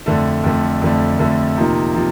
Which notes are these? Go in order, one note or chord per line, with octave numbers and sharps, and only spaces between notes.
F2 D3 A3
F2 D3 A3
F2 D3 A3
F2 D3 A3
C3 F3 A#3 D#4
C3 F3